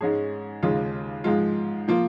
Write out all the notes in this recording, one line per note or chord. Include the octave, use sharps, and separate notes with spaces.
G#2 G#3 C#4 G#4
D#2 C#3 G#3 F4
G#2 F3 G#3 F4
F3 A#3 F4